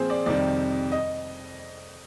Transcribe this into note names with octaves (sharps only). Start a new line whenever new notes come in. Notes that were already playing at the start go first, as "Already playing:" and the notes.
Already playing: A#2 F3 C4 G#4 C5
D5
F2 C3 D#3 G3 D5
D#5